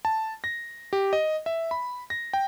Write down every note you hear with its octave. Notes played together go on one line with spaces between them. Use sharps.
A5
A#6
G4
D#5
E5
B5
A#6
G5